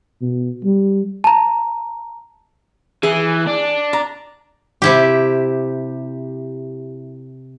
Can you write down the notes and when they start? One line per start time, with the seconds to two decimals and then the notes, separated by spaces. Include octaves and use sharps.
0.22 B2
0.64 G3
1.24 A5 A#5
3.03 E3 G#4
3.47 D4
3.93 A#5
4.82 C3 E4 G4